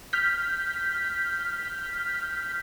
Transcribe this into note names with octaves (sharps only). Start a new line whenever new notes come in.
F6 G6 B6